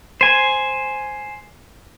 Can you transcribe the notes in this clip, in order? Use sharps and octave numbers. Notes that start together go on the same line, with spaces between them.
C5 G#5